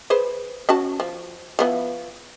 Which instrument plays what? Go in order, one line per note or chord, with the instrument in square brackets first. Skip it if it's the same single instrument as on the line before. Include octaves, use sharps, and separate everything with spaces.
[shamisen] G#4 B4 C5
C#4 F#4 A5
F3
F3 B3 E4